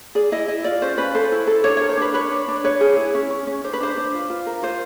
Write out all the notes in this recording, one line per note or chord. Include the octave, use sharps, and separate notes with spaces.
G#4 D5
E4 D#5
E4 D#5
F4 D5
C#4 C5
C#4 B4
A4 C5
E4
A4
D4 C#5
A#4 C#5
C5
D4 B4
B4 C#5
D4
D4
B4 C#5
G#4
E4
C#4
C#4
C#4
D4 C5
B4
D4 C5
D4
F4
F4
A#4
F4 C5